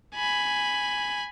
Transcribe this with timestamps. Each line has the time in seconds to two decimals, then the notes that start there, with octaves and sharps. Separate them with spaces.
0.15 G#5 B5